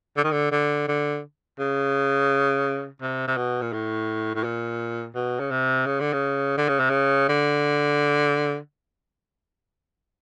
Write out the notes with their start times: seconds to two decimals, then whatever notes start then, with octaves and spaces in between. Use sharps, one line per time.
0.17 D3
0.24 D#3
0.32 D3
0.52 D3
0.88 D3
1.59 C#3
3.02 C3
3.28 C3
3.37 B2
3.62 A#2
3.73 A2
4.35 A2
4.44 A#2
5.15 B2
5.40 C#3
5.51 C3
5.86 C#3
6.00 D3
6.13 C#3
6.58 D3
6.69 C#3
6.80 C3
6.90 C#3
7.29 D3